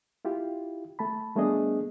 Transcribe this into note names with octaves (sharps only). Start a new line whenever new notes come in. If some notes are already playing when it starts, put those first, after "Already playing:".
E4 F4 G4
A3 A5 B5
G3 A3 B3 D4 G#4 D#5